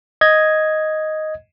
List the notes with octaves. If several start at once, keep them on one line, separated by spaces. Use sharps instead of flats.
D#5 G#6